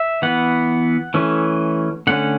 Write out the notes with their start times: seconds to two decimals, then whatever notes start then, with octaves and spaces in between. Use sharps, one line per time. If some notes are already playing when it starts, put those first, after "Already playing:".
Already playing: E5
0.22 E3 B3 F#5
1.14 E3 A3 C#4
2.07 D3 A3 C#4 F#5